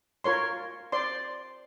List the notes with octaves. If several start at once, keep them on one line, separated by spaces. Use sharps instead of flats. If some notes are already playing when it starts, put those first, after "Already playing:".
F4 A#4 C#5 C6
C5 D5 C6